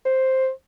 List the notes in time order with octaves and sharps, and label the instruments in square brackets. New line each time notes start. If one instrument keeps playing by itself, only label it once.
[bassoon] C5